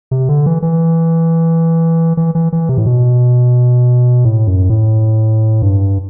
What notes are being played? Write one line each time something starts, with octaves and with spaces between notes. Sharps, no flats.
C3
D3
E3
E3
E3
E3
E3
C3
A2
B2
A2
F#2
A2
G2